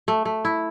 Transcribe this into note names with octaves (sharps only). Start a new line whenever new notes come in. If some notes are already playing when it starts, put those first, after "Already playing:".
A3
A3
E4